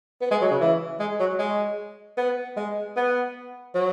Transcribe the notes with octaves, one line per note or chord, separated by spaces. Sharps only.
B3
G#3
F#3
C#3
E3
G#3
F#3
G#3
B3
G#3
B3
F#3